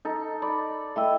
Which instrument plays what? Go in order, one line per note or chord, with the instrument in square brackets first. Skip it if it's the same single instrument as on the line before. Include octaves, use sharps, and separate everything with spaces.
[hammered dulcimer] D#4 A4
[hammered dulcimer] D5 [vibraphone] B5
[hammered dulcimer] A3 E4 [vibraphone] D#5 G5 E6